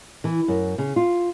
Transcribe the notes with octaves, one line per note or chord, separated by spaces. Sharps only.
E3
F#2
C#3
F4